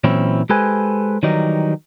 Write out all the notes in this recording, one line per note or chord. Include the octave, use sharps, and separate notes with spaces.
A#2 E3 F#3 C4 C#4 E4
G#3 G4 A4 B4 C5 G#5
D#3 E3 F#3 G3 D#4